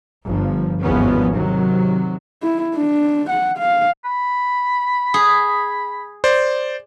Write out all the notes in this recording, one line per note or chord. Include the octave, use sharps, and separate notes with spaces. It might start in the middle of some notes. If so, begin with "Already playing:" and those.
G1 F3
G#1 E2 G2 F3 B3 C#4
C3 D#3 F#3
E4
D4
F#5
F5
B5
G#4
C5 D5